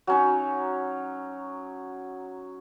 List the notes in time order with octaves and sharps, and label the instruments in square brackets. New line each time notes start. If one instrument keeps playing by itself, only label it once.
[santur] F#3 C#4 D#4